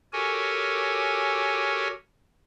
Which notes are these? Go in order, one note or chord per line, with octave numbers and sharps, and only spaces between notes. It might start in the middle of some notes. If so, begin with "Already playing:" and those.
F#4 G4 A4 A#4 C#5 G#5